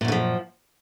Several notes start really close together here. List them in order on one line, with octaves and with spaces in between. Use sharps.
A#2 F#2 D3 F3